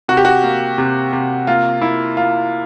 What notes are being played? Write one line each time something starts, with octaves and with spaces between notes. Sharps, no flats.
C3 F#4
G4
F#4
A#3
C3
C3
A#3 F4
A#3 E4
A#3 F4